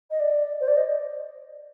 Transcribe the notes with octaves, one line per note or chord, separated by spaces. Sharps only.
D#5
D5
C5
D5
D#5